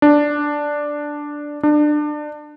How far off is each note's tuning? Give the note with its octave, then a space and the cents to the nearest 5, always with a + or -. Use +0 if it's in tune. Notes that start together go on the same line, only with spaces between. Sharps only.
D4 +0
D4 +25